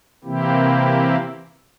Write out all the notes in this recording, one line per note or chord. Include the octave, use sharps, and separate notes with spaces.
C3 E3 A#3 C4 E4 G4